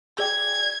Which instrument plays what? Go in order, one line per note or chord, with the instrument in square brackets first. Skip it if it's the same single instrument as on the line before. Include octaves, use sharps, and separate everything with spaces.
[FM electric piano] G#4 D5 G5 [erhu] G#6